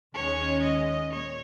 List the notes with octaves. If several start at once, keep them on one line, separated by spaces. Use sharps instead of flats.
D#2 D#3 G#3 C#4 C#5
D#5
A#2 C#5